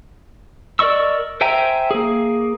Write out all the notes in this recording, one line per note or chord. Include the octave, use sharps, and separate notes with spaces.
A#4 D5 D#5 C#6 E6
C5 E5 G5 G#5 A#5
A#3 G#4